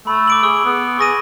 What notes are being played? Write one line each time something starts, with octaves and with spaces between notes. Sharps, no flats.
A3 B5
D6 D7 F#7
G#4 C#6 E6
B3
G#4 C#6 A#6 D#7